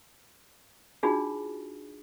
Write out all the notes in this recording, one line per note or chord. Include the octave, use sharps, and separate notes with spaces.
D4 D#4 F4 F#4 G#4